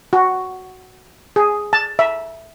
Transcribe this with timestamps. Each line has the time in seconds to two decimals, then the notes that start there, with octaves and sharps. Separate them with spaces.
0.13 F#4
1.36 G#4
1.73 A5
1.99 E5